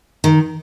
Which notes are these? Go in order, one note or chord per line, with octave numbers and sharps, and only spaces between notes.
D#3